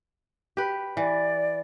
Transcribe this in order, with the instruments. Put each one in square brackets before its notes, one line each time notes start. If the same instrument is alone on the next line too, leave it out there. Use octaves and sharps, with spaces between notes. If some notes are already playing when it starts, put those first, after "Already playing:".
[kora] G4 B4
[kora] E3 [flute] D5